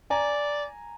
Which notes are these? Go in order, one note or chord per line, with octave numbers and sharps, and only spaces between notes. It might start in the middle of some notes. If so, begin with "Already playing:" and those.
D5 G#5 A#5